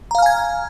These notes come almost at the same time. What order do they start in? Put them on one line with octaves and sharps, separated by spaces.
A#5 F5 F6 G#5 G#6